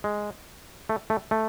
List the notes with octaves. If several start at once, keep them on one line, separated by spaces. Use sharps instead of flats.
G#3
A3
A3
A3